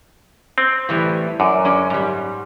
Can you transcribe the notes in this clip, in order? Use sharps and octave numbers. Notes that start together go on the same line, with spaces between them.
C4
A2 E3 G3
F#2 D5
G#3 C#4 D5
G#2 G3